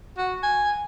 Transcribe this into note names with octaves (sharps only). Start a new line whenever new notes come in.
F#4
G#5